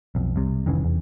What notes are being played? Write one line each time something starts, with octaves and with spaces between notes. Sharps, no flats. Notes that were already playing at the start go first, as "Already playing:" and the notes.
B1 F2
C2 C3
F1 D#3 E3 C#4
E2